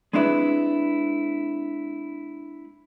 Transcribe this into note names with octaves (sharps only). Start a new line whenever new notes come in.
G#3 C4 D4 E4 B4